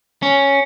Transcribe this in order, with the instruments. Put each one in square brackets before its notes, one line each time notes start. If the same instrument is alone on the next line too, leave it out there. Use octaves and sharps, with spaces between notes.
[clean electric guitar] C#4